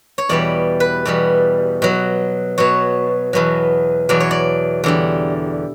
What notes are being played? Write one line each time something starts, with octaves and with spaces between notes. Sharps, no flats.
C#5
E2 B2 G3 D5
B4
E2 B2 G3
B2 F#3
B2 F#3 C#5
E2 B2 F#3
E2 B2 F#3 D5
C#5
D5
E2 D3 G3